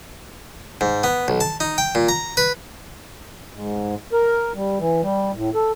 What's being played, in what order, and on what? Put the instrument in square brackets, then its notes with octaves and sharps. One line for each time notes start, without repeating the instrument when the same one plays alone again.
[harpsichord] G#2
B3
B1
A5
D#4
G5
A#2
A#5
B4
[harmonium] G#2
A#4
G3
E3
G3
A2
A4